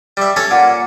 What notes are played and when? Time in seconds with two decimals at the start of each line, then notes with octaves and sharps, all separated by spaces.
0.17 G3 E5
0.36 C#4 A4 C#5
0.51 A#2 F#5